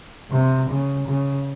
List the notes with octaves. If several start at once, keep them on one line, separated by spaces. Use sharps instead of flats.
C3
C#3
C#3